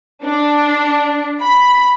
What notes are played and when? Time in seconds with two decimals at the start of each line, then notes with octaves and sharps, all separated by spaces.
0.25 D4
1.42 B5